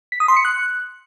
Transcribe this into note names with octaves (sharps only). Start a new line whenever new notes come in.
B6
D#6
C6
C#7
F#6